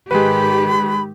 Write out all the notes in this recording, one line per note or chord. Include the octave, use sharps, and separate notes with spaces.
G#2 D#3 G#3 G4 B4 B5